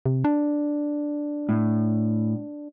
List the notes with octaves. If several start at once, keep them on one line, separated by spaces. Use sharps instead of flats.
C3
D4
A2